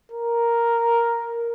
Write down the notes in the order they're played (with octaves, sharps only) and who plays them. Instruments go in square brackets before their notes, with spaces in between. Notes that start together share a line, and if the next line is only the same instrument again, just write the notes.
[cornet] A#4